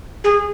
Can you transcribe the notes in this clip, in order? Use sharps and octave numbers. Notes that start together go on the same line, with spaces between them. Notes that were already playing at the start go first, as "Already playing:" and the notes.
G#4